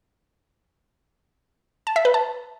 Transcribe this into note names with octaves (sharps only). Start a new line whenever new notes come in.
A5
E5
B4
A5